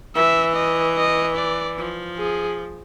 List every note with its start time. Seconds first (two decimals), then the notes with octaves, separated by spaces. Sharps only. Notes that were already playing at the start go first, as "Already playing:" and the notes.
0.15 E3 E5
0.55 D#5
0.97 D#5
1.36 D5
1.77 F3
2.18 G#4